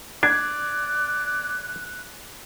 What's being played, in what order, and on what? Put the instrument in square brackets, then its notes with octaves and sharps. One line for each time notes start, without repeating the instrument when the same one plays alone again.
[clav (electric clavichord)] D4 [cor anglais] D5 [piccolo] F#6 [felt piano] G#6